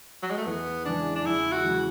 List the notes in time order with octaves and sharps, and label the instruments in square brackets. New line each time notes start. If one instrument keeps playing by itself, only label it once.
[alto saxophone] F#3
G#3
A3
[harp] E2 [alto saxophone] B3
[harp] C#3 E3 G#3 C#4 [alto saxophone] D4
[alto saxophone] D4
[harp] E2 [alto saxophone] E4
[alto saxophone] F#4
[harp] C#3 E3 G#3 C#4